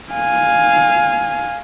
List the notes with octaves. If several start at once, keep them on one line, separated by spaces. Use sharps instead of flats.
F5 G#5